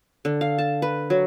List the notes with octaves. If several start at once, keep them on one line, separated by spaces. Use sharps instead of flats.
D3
F5
A5
B4
F#3